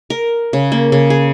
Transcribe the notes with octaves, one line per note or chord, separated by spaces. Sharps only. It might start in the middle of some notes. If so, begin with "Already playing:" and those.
A#4
C#3
A#3
C#3
G#4